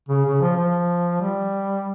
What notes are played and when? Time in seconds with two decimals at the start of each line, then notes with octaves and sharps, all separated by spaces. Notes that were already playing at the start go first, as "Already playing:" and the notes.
0.09 C#3
0.25 C#3
0.41 F3
0.57 F3
1.22 G3